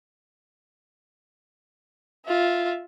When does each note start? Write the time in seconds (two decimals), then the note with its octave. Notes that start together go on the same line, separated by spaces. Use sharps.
2.26 F4 E5